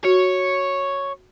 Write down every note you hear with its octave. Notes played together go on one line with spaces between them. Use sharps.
F#4 C#5